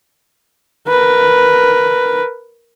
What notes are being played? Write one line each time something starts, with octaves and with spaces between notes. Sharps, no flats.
A#4 B4